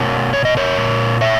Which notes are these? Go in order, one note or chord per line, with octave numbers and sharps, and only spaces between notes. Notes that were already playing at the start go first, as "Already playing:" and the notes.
Already playing: B2 A#4 C#5
C#5
D#5
A#4 C#5
A#2
C#5 E5